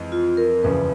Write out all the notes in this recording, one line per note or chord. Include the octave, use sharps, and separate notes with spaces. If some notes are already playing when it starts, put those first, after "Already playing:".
Already playing: F2 E3 G#3
F4
A#4
F#1 E2 C#3 F3 B4